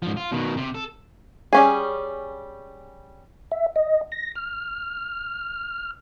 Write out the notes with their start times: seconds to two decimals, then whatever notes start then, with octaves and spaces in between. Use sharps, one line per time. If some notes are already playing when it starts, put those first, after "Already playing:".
0.02 G#2 F3
0.17 F4
0.32 B2 D#3
0.57 C3
0.74 A4
1.53 G3 C#4 G#4
3.52 E5
3.76 D#5
4.12 A#6
4.35 F6